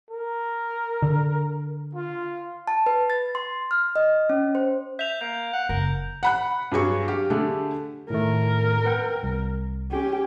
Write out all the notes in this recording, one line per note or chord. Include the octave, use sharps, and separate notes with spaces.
A#4
D3
F4
A5
B4
A6
C6
F6
D#5
C#4
C5
E5 G6 F7
A#3 G6
F#5
F#1 A#4
F#5 B5 F#6
G2 F#3 G#4 C#6
G4 F5
D3 A3 G4 G#4
A2 D#3 A3 A#4
B4 F#5 G5
C2
C#4 G4